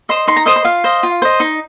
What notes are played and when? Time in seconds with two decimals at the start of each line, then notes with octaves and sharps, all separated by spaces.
0.09 C5 D#5 C6
0.28 D#4 C6
0.36 A#5
0.46 C5 D#5 D#6
0.56 C6
0.64 F4 F5
0.84 C5 D#5
1.03 F4
1.22 C5 D#5
1.40 D#4